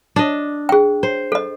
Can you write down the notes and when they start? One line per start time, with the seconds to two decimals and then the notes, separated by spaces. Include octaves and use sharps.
0.16 D4 D#5
0.69 G#4 G5
1.03 C5
1.32 A4 D#5